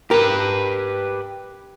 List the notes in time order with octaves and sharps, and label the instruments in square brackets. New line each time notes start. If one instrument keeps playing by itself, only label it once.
[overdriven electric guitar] G4 B4 [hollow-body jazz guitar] A#4